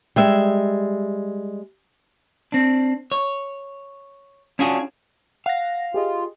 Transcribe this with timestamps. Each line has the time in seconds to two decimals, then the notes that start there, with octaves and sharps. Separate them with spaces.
0.16 G3 G#3 E5
2.52 C4 D4
3.12 C#5
4.59 C#4 D4 F4 F#4 G#4
5.46 F5 F#5 A#6
5.94 F4 G4 G#4 D#5